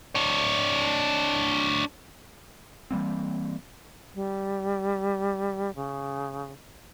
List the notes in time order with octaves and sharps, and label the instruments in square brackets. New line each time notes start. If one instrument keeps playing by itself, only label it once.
[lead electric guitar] D4 C#5
[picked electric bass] E3 G3 A#3 C4
[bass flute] G3
C#3